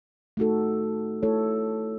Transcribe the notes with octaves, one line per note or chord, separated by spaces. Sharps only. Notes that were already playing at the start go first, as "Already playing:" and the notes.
A3 D#4 F#4 A4
A3 E4 A4 C#5